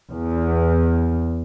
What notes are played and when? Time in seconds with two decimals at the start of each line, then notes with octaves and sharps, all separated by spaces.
0.11 E2